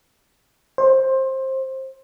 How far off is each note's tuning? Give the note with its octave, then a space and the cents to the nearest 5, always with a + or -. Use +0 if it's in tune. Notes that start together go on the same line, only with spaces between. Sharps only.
C5 +20